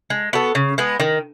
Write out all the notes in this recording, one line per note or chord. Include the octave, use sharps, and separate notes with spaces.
G#3
B3 F#4 A4
C#3
G#3 B3
D#3